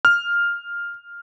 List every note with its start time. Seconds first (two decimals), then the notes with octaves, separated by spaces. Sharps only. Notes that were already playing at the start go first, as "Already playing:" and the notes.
0.05 F6